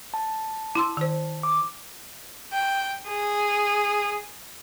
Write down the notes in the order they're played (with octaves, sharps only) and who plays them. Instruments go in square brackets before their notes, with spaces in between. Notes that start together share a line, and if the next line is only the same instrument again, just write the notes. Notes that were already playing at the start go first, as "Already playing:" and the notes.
[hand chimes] A5
[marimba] E4 C6 E6
D#3 C5
[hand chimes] D6
[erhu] G5
G#4